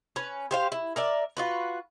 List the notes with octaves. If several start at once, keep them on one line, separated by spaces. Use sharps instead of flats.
C#4 B4
G4 C5 F5
E4
A#4 D5 E5
F4 F#4 B4